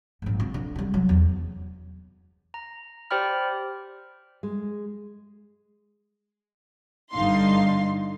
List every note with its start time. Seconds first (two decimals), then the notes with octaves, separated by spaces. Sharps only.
0.22 A#1 G#2
0.40 C3
0.54 D3
0.76 C3 G3
0.94 F#3
1.09 E2
2.54 A#5
3.11 G4 C5 D5 G5 B5 F6
4.43 G#3
7.12 G1 G2 D3 D#4 F5 C6